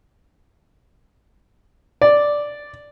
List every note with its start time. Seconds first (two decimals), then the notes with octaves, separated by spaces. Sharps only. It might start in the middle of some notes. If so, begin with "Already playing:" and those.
2.02 D5